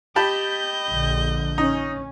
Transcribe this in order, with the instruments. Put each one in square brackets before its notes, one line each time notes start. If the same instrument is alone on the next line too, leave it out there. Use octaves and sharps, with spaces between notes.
[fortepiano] G4 A5 B5 [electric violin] D#5 G6
[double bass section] A#1 D3
[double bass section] C#4 [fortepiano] D#4